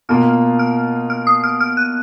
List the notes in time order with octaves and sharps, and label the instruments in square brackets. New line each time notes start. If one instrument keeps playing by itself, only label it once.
[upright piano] B2 A#3 F4 [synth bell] F6
[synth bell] F6
F6
D#6
F6
F6
F#6